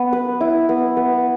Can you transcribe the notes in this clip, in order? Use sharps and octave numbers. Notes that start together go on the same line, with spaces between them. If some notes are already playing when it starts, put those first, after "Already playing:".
Already playing: B3
B4
E4
B3
B3